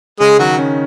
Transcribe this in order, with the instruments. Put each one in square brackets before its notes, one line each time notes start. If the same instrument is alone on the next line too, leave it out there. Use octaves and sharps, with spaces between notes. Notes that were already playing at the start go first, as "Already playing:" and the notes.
[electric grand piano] C#3 [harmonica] G#3 G#4
[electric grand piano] D#3 [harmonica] F#3 F#4
[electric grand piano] C#4